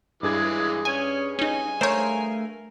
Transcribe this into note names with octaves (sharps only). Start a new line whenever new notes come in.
G2 E3 G#3 G#4 D6 G#6
C#4 G#5
C#4 D#4 G#5
A3 A#4 C5 C#5 F5